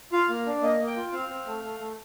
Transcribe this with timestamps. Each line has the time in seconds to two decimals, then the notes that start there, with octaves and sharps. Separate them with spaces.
0.12 F4 F5
0.29 A#3
0.46 D4
0.62 A#3 D#5
0.80 A#3
0.87 G5
0.96 F4
1.12 C4 F5
1.29 C4
1.46 A3
1.63 A3
1.79 A3